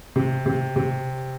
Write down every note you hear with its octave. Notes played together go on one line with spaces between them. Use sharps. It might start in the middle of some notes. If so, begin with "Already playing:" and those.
C3
C3
C3